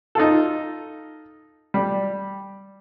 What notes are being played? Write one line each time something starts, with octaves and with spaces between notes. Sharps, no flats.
D#4 F4 A4
G3